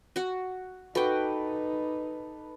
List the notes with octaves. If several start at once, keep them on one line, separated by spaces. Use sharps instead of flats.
F#4 F#5
D#4 F#4 A4 B4 G5 D6